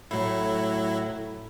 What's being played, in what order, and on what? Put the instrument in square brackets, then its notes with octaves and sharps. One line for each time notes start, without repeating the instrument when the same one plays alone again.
[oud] A2 [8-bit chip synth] F#3 E4